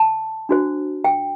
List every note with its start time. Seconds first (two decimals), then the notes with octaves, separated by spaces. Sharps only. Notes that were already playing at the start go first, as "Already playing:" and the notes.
Already playing: A5
0.49 D4 F#4 C5
1.04 G5